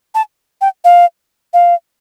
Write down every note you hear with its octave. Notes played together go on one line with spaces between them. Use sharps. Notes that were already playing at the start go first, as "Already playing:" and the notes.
A5
G5
F5
F5